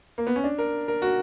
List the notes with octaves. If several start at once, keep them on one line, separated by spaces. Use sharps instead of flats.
A#3
B3
C#4
D4
A#4
A#4
F#4